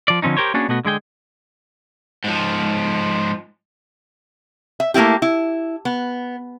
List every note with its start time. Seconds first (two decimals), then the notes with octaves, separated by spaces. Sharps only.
0.08 F3 D5
0.22 D3 F3 C4 C#4 D#4
0.37 G4 A#4 C5 C#5
0.54 A#3 B3 C#4 D4 F#4 G#4
0.68 B2 A3 B3 F#4
0.85 D3 G#3 G#4 G5
2.24 G#2 F3
4.80 E5
4.94 A3 A#3 C4 E4 G4
5.22 E4
5.85 B3